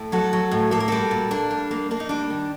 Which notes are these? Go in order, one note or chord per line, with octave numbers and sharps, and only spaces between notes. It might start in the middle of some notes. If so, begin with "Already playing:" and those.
Already playing: A2
F#3 F#4 A4
F#3
A2
A#3 A4
A#4
G3 F#4 A4
A#2
A#3 D4
G3
A#3
A#3 D4
D#4
G3 D4
D#3